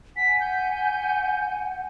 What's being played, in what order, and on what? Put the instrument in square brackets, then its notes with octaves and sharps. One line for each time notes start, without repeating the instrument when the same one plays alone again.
[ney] F#5 [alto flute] G#5 [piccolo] B6
[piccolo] G6